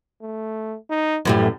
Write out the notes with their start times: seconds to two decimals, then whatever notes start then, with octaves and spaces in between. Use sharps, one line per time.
0.22 A3
0.90 D#4
1.25 F#2 A2 E3 G3